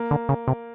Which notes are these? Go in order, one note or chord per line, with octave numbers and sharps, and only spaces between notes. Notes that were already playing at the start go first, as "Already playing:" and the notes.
Already playing: A#3
D3
C#3
C3